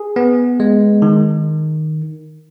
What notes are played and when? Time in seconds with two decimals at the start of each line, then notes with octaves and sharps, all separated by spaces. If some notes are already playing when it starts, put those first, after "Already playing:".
Already playing: G#4
0.16 B3
0.60 G#3
1.02 D#3